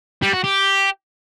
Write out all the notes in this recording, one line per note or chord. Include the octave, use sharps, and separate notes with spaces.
G3
F#4
G4